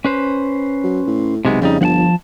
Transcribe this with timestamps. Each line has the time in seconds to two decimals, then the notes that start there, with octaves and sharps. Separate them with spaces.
0.05 C#4 B4 C5
0.84 F#3
1.07 A2
1.45 B1 C3 G#3 B3
1.61 F2 C#3 G3 D#4
1.81 G1 F3 F#5 A5